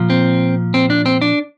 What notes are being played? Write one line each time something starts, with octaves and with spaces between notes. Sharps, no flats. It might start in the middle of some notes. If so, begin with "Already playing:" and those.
Already playing: A#2 F3
C4
C4
D4
C4
D4